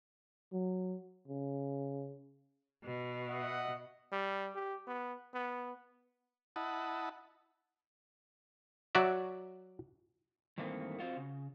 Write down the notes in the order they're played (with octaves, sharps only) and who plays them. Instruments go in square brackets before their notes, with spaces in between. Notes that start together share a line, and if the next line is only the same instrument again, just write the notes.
[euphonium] F#3
C#3
[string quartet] B2
[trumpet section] D#5 E5 F#5
[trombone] G3
G4
B3
B3
[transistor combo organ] E4 D#5 F#5 A5 B5
[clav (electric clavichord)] F#3 F#4 D5 E5
[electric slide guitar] G2 D#3 E3 A3 A#3 C4
C4 F4 F#4
C#3